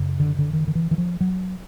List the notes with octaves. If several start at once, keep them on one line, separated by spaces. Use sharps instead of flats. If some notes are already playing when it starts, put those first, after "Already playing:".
Already playing: F#2 C#3
D3
D3
D#3
D#3
E3
E3
F3
F#3